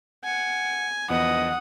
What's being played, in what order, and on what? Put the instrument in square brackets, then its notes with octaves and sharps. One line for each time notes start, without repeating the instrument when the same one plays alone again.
[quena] F#5 [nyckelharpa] G#5
[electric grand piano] E2 F3 B3 [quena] D#5 [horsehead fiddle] F#5 [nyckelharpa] D#6